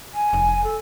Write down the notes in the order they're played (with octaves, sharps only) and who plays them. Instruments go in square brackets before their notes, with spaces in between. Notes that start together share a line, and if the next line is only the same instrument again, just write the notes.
[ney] G#5
[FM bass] F1
[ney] A4